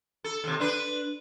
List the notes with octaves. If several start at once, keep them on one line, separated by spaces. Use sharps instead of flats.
A4
D#2 C3
D4 B4